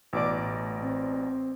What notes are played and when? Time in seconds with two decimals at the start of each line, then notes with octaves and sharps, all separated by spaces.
0.13 A1 B2 D5 D6
0.39 A2
0.82 C4